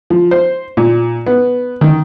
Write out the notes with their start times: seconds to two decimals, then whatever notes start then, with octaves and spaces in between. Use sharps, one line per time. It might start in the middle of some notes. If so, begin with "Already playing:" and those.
0.10 F3
0.31 C5
0.77 A#2
1.27 B3
1.81 D#3